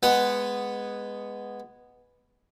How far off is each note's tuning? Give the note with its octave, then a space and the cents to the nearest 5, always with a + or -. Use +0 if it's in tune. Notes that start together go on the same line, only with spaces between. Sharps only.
G#3 -10 B3 +0 F#5 +0